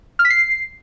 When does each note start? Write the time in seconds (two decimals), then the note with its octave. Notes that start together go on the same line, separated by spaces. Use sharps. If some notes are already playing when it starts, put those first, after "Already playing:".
0.19 F6
0.25 B6
0.30 C7